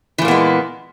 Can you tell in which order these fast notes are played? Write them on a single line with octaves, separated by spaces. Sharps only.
E3 A#2 A#3 B3 G#3